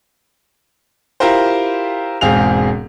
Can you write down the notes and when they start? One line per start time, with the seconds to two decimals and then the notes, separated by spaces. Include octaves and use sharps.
1.20 E4 F4 G4 A#4 C5
2.21 E1 G#2 C4 G#4 F5 F7